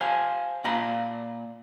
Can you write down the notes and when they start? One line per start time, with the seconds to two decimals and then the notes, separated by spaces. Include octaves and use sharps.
0.01 C5 F5 G#5
0.64 A#2 D5 F5 A#5 B5